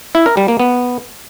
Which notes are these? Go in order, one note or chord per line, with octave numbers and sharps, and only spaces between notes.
E4
A#4
G3
A#3
B3